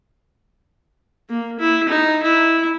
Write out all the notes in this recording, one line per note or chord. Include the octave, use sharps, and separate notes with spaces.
A#3
E4
D#4
E4